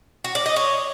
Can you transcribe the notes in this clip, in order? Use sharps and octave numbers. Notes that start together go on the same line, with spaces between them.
F#4
D5
D#5
C#5